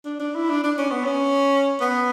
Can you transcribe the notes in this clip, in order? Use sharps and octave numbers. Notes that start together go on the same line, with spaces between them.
D4
D4
E4
D4
D4
C#4
B3
C#4
B3